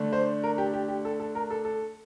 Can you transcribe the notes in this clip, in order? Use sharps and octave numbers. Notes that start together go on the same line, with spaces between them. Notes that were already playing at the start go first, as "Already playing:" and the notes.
Already playing: D3 A3 D4
C5
A#4
G4
G4
G4
A4
A4
A#4
A4
A4